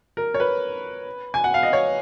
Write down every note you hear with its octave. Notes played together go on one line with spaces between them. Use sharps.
A#4
C#5
B4
G#5
F#5
F5
D#5
C#5